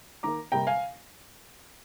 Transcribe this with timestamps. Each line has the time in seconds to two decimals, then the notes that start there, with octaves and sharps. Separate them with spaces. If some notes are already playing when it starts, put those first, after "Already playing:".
0.23 D#3 A#3 A#5 D6
0.52 C3 G3 A#3 G5 A#5
0.67 F5 G#5